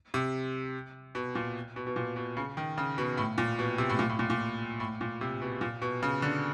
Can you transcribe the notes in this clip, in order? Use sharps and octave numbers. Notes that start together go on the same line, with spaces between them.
C3
B2
A#2
B2
B2
A#2
B2
C#3
D#3
C#3
B2
A2
A#2
B2
C3
A2
A#2
A2
A#2
A#2
A2
A#2
C3
B2
A#2
B2
C#3
D3